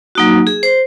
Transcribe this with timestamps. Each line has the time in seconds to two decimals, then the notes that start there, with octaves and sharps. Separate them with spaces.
0.15 F#3 A#3 D#4 F#4
0.47 G#4
0.63 C5